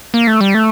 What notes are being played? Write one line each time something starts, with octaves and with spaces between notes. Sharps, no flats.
A#3
A3
G3
A3